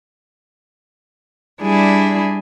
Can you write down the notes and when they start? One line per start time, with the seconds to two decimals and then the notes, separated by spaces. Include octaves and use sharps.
1.61 G3 D4 E4 G#4